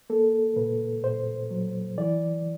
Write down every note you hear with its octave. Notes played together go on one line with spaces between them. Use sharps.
A#3 A4
A#2 B4
A#2 C5
F#3
E3 D5